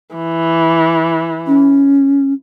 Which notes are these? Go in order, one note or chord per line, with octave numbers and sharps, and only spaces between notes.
E3
C#4